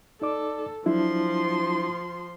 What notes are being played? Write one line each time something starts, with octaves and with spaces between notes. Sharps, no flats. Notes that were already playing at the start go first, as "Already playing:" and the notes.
D#4 A4 D5 D6
F3 F#3 D4 E4 C6